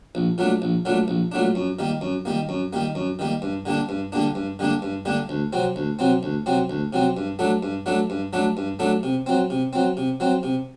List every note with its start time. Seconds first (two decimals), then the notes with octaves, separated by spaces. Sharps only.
0.15 A#1
0.38 A#2 F#3 A3 D4
0.62 A#1
0.85 A#2 F#3 A3 D4
1.08 A#1
1.32 A#2 F#3 A3 D4
1.55 F#2
1.79 D#3 G3 A#3
2.01 F#2
2.25 D#3 G3 A#3
2.49 F#2
2.73 D#3 G3 A#3
2.95 F#2
3.19 D#3 G3 A#3
3.42 G2
3.65 D3 G3 A#3 D4
3.89 G2
4.12 D3 G3 A#3 D4
4.35 G2
4.59 D3 G3 A#3 D4
4.82 G2
5.05 D3 G3 A#3 D4
5.29 D2
5.53 C3 F#3 C4
5.76 D2
5.99 C3 F#3 C4
6.23 D2
6.46 C3 F#3 C4
6.70 D2
6.93 C3 F#3 C4
7.17 G2
7.39 F#3 A3 D4 A4
7.63 G2
7.86 F#3 A3 D4 A4
8.10 G2
8.33 F#3 A3 D4 A4
8.57 G2
8.79 F#3 A3 D4 A4
9.03 C3
9.26 F#3 C4
9.50 C3
9.73 F#3 C4
9.97 C3
10.20 F#3 C4
10.43 C3